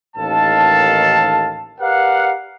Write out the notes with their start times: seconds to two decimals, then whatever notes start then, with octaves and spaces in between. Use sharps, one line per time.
0.16 A1 D#2 D#3 A4 F5 A5
1.80 G4 A#4 B4 D5 F5 F#5